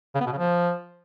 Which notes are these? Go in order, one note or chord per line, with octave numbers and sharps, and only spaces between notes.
C#3
B3
B2
C#3
F3